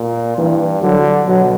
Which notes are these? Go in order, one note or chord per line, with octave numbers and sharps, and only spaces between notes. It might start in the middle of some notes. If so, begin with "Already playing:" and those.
Already playing: A#2
G2 E3
D3 F#3
B2 F#3